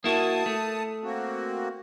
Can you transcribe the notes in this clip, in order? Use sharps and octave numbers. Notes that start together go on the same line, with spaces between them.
A#3 E4 F#4 A5 D#6
A3
A#3 C4 F#4